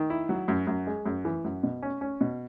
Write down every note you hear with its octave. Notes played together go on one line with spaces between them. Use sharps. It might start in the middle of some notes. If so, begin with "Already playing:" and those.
Already playing: D#3
E4
F#3
F#2
F#2
G#3
F#2
E3
F#2
B2
C#4
C#4
B2